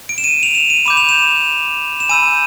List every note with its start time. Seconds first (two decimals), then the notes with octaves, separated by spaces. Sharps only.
0.09 D7
0.18 E7
0.24 D#7
0.43 F7
0.55 E7
0.70 D#7
0.86 B5 D6 G6 E7
0.97 F7
1.09 E7
2.00 E7
2.09 G#5 B5 E6 G6 D#7